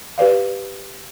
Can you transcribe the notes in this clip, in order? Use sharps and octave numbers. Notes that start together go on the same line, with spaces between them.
G4 B4 D5 F5